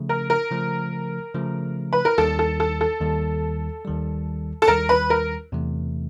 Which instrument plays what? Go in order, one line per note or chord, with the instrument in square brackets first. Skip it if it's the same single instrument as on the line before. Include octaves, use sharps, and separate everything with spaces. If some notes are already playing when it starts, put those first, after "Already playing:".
Already playing: [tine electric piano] C#3 F3 A3
[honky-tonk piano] A#4
A#4
[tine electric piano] C#3 F3 A3
C#3 F3 A3
[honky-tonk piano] B4
A#4
[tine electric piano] D#2 D#3 G3 [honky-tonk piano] A4
[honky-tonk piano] A4
A4
A4
[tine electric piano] D#2 D#3 G3
D#2 D#3 G3
[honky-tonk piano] A4
[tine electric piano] D#2 D#3 G3 [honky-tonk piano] A#4
[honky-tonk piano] B4
A#4
[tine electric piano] E2 C3 E3 A3